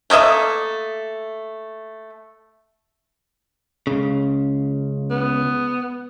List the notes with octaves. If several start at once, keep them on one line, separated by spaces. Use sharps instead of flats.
A3 A#3 D#5 E5
C#2 C#3
B3